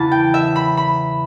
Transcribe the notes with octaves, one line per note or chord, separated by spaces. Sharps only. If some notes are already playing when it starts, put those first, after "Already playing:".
Already playing: E2 C#3 E3 A5 B5
G5
E5
B5
B5